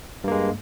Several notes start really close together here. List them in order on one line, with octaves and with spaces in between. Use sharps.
G2 A#3 G#3